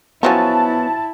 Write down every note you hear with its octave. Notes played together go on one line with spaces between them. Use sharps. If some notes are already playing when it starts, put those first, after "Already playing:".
F3 F#3 B3 C#4 E4 C#5 A5